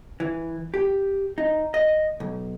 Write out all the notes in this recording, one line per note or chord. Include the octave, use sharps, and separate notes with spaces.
E3
G4
D#4
D#5
B1